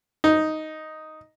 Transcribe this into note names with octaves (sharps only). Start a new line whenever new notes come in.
D#4